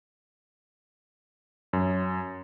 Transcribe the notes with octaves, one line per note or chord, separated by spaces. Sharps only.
F#2